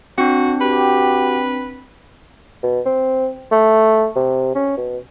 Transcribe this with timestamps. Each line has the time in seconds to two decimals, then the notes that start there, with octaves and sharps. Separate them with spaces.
0.18 C4 D4 F#4
0.61 F#4 G4 B4
2.63 B2
2.86 C4
3.52 A3
4.16 C3
4.55 C#4
4.77 B2